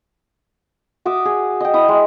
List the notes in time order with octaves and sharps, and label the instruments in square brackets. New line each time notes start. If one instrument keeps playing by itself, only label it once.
[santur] F#4 E5 D6 D#6
G#4
D#5 G5
E4 D#6
G#3